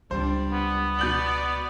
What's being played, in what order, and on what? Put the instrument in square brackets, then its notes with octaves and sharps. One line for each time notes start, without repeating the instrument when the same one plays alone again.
[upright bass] C#2 C3 [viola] G3 D4 [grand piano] C5
[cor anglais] B3
[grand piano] B2 G6 F#7 [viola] D5